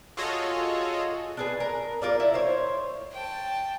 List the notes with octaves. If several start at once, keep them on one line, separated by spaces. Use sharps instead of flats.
F4 F#4 G#4 A4 C#5 D#5
D4 G#4 B4
A#4
D4 F4 A#4 D5
E4
C5 C#5
G5 A5